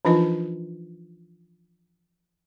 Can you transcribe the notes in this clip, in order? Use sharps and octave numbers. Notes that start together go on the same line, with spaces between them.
E3 F3 D4 D#4 F4 D#5